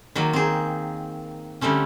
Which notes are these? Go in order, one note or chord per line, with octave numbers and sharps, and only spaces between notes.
D#3 F#3 A#3
C4 G#4
D3 G3 A3 C4 C#4